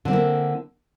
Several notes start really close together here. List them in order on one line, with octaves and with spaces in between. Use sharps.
D3 C4 A#3 E4